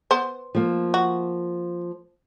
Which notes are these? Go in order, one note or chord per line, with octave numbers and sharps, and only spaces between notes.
B3 C5
F3 A#3
F#4